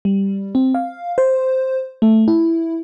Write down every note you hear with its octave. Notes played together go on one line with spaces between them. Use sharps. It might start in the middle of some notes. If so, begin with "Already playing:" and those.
G3
C4
F5
C5
A3
E4